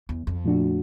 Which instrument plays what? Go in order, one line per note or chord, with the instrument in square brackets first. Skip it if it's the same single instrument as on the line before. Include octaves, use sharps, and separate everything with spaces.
[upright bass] E2
F2
[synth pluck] A#2 F3 A3 D4 F#4